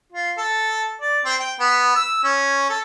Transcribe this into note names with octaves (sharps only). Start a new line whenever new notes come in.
F4
A4
D5
C4
G5
B3
E6
C#4
A4